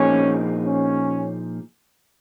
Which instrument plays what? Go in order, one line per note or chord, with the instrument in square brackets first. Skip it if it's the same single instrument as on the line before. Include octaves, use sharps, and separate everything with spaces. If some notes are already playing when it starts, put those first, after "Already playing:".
Already playing: [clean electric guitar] A#2 F3 A#3 D#4 G#4 [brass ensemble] C#4
[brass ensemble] C#4